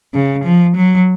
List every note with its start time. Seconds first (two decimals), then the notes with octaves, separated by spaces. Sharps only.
0.14 C#3
0.44 F3
0.77 F#3